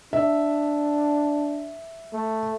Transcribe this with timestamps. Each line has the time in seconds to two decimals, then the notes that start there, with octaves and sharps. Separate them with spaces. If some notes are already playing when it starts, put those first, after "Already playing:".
0.13 D4 E5
2.13 A3